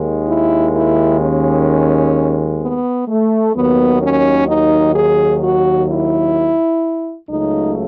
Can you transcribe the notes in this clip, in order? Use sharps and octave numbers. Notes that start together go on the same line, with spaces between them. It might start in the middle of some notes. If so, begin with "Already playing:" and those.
Already playing: D#2 D#3 G#3
E4
E4
C#4
B3
A3
D#2 D#3 F#3 B3
C#4
D#4
G#4
F#4
E4
C#2 C#3 F#3 A3 D#4